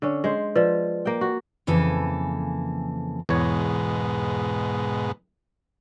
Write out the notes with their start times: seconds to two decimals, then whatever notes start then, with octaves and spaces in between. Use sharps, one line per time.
0.02 D3 C#4
0.24 G#3 C5
0.56 F3 B4 D5
1.05 A#3 G5
1.21 F#4
1.67 F2 C#3 E3 A#3 A4 G#5
3.29 E2 G#2 B2 C#5